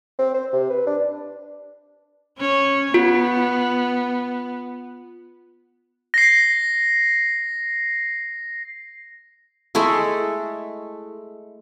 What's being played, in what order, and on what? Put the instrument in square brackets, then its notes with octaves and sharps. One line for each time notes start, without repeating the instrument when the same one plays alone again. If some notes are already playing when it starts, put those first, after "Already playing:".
[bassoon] C4
C5
C3
B4
D4
[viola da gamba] C#4 C#5
[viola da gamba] B3 [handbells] F4
[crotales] A#6 C7
[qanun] G#3 A3 E4 A4